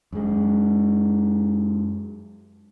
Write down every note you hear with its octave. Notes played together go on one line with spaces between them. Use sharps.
F#2 G#3